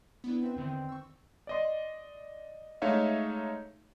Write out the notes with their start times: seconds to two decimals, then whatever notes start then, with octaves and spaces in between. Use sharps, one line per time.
0.24 B3 D4 E4
0.42 C4 B4 E5
0.56 E2 D3 D#3 C4
0.89 C#6 E6
1.47 D5 D#5 C6
2.82 G#3 A3 D#4 C#5 E5 F5